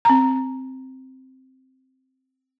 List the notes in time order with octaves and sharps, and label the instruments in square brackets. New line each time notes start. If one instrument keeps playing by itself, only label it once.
[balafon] C4 A#5